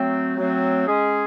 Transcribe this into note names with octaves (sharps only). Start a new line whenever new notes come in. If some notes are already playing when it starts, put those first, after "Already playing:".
Already playing: F#3 A3 C4
F#3 A3 C4
G#3 C#4 G#4